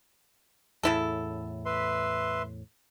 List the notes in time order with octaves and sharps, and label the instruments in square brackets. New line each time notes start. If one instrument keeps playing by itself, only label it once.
[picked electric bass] E2 A2 [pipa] C#3 E4 A4
[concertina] B4 E5 C6